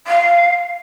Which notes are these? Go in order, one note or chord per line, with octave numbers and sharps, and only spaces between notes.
F5